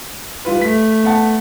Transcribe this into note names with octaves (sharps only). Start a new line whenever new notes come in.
G3 F4 B4
A3 B6
B3 F#5 A5